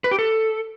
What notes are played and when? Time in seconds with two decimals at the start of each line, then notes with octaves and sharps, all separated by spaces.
0.04 B4
0.11 G4
0.19 A4